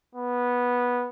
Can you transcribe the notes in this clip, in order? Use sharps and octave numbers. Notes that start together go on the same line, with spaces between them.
B3